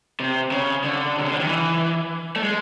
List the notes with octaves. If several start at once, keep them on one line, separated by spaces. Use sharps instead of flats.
C3
C#3
D3
C3
C#3
D3
D#3
E3
A3
G#3